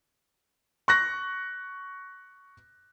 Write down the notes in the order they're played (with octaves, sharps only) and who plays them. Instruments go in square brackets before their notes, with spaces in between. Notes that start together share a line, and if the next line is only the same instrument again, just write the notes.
[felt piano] C#6 F#6 A#6